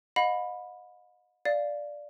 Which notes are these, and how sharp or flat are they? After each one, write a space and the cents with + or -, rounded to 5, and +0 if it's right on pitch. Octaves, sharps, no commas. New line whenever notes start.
D#5 +0 F#5 -45 B5 +0
D5 +0 F5 +0